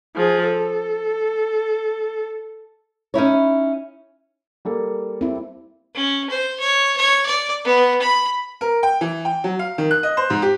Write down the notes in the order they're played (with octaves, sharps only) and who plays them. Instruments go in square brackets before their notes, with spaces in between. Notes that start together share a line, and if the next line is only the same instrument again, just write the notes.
[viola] F3 G#4
A4
[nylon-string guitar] C#4 D#4 E4 C#5
[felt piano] G3 A#3 A4
[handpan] C4 E4
[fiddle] C#4
C5
C#5
C#5
D5
B3
B5
[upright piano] A#4
G5
E3
G5
F#3
F5
D#3
F#6
D#5
C5
G#2
G4